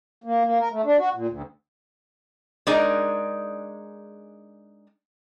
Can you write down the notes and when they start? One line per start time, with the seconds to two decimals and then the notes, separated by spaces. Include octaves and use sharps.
0.24 A#3
0.45 A#3
0.59 A#4
0.72 A3
0.85 D4
0.98 F#4
1.15 A#2
1.29 D2
2.67 G#3 D4 D#4 G#4 A#4 D5